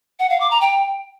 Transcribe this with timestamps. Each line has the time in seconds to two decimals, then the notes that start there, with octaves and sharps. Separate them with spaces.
0.19 F#5
0.30 F5
0.40 D6
0.51 A#5
0.61 G5